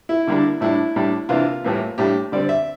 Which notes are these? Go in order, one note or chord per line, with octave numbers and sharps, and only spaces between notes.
E4
D3 G3 A#3 D4
A2 G3 D4 E4
A2 G3 D4
C3 E3 A#3 D4 F4
A2 E3 G3 A#3
A2 G3 D4 G4
D3 G3 C4 D5
E5